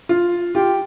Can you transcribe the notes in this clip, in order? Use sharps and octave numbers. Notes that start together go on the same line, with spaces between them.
F4
F4 G4